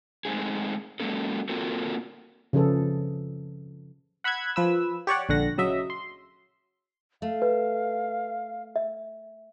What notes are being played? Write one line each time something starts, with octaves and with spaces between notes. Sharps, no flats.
G#3 A3 C4 D#4 G#4
F#3 G#3 A#3 C#4 A4
A#3 C4 F4 F#4 A4 A#4
C#3 F3 C#4 G#4 A4 B4
F#5 B5 E6 F#6 G#6
F3 B4 E6
G4 C#5 D5 F#5
A#1 D3 F#5 A#6
C#3 F#3 D#5 E5
C6
A3 F5
B4
E5